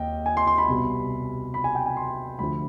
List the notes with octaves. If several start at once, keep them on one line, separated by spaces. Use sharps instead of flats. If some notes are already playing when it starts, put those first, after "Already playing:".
Already playing: D#2 D#5 G5
G#5
C6
C6
B5
C2 B2
B5
G#5
G5
G#5
C6
D2 D3 F3 B5